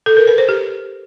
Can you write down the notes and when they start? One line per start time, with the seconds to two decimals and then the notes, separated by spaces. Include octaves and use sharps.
0.06 A4
0.17 A#4
0.27 B4
0.38 C5
0.49 G4